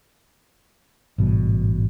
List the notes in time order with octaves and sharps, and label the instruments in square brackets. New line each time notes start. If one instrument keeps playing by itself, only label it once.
[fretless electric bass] A1 G#2 B2 G3